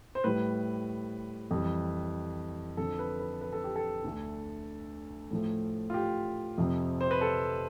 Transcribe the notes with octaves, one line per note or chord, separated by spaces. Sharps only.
C5
A2 G3 B4
F2 E3 G3
F2 D3 F3 A4
B4
B4
B4
A4
G4
A4
D2 D3 A3
A2 F3 A3
F4
G4
F2 C3 F3
C5
B4
A4